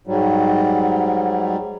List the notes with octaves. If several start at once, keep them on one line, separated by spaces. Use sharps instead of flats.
G#2 F#3 G3